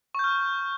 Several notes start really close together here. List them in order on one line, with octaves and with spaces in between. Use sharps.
C#6 G6 F6